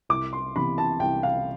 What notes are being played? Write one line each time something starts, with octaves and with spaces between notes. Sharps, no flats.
C2 D6
C6
C3 E3 B3 B5
A5
C2 G5
F5